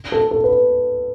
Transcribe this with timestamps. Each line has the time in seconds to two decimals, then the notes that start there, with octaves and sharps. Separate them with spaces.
0.12 A4
0.31 A4
0.44 B4